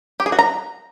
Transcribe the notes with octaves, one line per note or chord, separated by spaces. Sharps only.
G4
G#4
F#4
A#5